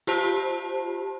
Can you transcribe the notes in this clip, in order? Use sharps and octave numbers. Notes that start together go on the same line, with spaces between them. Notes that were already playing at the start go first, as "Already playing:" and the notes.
F4 G4 C5 A5